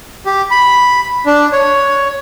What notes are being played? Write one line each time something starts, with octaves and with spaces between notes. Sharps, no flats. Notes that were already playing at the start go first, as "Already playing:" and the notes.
G4
B5
D4
C#5